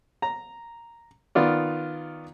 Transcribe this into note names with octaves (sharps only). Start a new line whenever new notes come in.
A#5
D#3 B3 F4 D5